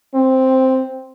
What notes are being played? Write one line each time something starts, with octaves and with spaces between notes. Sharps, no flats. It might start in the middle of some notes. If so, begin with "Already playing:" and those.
C4